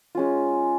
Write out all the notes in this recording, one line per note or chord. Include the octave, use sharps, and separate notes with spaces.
G#3 C#4 F4